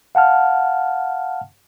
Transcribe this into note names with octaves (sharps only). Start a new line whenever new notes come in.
F5 F#5 A5 F6